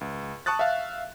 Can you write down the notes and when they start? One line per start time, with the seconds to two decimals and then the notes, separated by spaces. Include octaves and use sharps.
0.01 C#2
0.46 A5 C#6 D#6 F#6 A6
0.59 E5 F5